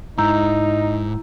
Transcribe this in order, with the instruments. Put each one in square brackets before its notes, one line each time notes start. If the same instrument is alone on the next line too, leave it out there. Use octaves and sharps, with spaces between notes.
[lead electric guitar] G#2 [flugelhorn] D#4 [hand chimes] E4 [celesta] A#5 E6 G6